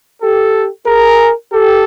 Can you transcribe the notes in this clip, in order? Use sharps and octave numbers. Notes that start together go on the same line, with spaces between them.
G4 A4
G#4 A#4
G4 A4